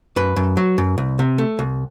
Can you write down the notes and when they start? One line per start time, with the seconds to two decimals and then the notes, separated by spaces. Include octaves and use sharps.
0.16 F#2 B4
0.36 F#2
0.57 F#3
0.78 F#2
0.98 C2
1.19 C3
1.38 A3
1.59 C2